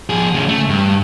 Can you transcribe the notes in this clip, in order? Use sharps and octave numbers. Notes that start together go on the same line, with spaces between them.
F3 G#4
C#3 A3
A3
G2